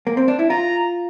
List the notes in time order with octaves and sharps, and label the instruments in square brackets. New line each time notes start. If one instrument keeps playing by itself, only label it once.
[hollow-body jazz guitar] A#3
C4
D4
E4
[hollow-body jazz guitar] F4 [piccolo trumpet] A#5